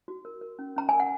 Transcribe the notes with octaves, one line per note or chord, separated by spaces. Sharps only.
F#4
A#4
A#4
C#4
C#4 A#5
A#4 G#5
F#5